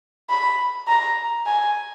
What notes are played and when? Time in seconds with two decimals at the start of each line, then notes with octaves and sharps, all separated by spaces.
0.30 B5
0.88 A#5
1.47 G#5